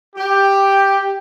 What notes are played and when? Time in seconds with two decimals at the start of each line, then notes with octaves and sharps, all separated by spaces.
0.16 G4